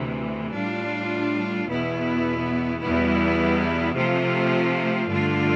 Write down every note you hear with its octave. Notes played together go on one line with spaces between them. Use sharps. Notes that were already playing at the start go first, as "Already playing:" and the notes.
Already playing: D2 C3 E3
A2 G3 D4 F4
E2 B2 B3 E4
E2 B2 G3 B3 E4
C3 F3 A3 C4 F4
G2 D3 A3 D4 F4